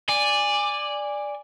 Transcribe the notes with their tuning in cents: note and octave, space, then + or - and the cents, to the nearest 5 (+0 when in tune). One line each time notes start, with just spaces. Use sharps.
D5 +0 G#5 -15